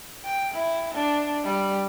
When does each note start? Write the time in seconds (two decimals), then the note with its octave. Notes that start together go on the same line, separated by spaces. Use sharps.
0.25 G5
0.53 E4
0.94 D4
1.44 G3